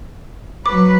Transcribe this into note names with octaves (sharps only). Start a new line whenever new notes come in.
F#3 B4 D6